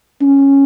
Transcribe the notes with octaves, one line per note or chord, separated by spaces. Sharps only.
C#4